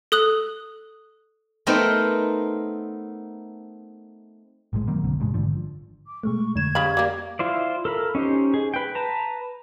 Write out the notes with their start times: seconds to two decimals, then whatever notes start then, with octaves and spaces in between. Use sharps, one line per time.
0.12 A4 D#6 F#6 F#7
1.67 A3 B3 C4 D#4 A#4
4.73 A#1 A2 F3 G#3
4.87 D#3 F#3 A#3 C4
5.04 B1 F#2 D3 A#3
5.20 A1 G2 B2 G#3
5.34 G#1 D3 F3
6.06 D6
6.23 B2 G#3 A3 C#6
6.56 F2 D3 G#6 E7
6.75 C#3 G3 F5 B5
6.97 G3 A#3
7.39 E4 F4 C5 D5
7.85 A4 A#4 B5
8.15 C#4 D#4 G4 C5
8.54 G#4
8.74 B4 G5
8.95 B4 A5 A#5